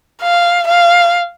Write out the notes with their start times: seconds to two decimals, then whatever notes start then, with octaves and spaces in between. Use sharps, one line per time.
0.22 F5
0.68 F5